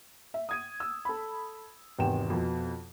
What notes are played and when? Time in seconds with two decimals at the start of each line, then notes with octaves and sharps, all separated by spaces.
0.34 E5
0.49 D#6 G#6 D#7
0.80 E6
1.05 A4 B5
1.98 G#1 E2 C3 D#3 G5 E7
2.30 F2 B2